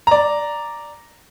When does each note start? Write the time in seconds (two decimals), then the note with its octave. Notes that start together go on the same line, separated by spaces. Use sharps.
0.07 D5 A#5